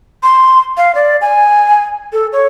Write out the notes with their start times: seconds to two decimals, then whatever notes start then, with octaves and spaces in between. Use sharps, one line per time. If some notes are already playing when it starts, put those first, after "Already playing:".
0.23 C6
0.77 F5
0.95 D5
1.21 G#5
2.13 A4
2.32 C#5